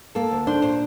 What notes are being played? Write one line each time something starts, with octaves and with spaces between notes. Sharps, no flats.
A#3 A4
D2
D4 C5
A#2 C5